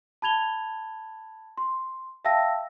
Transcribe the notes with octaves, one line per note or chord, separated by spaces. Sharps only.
A5 B5 G#6 F7 G7
C6
E5 F5 G5 A5 E6 A#6